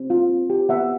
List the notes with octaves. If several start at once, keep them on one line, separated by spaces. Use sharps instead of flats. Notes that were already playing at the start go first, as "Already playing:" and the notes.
Already playing: C4
F4
C4
G4
B3 E5 F#5